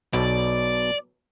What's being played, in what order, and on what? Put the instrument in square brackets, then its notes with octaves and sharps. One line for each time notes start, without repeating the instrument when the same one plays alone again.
[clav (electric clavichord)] B1 B2 [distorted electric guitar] D5